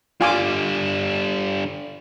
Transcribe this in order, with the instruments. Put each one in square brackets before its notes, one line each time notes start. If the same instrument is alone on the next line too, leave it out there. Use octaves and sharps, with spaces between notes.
[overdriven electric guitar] D3 G3 [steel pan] F4 G#5 D6